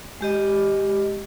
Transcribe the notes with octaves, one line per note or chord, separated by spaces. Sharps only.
G#3 G4 D#5